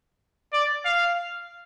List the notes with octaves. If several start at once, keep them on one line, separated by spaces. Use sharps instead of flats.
D5
F5